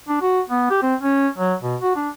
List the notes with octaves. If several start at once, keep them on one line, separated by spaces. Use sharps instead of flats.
D4
F#4
B3
G4
C4
C#4
F#3
B2
F#4
D4